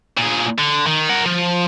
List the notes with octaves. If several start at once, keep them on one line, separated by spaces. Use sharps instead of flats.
A#2 G#4
D3
D#3
A#4 F#5
F3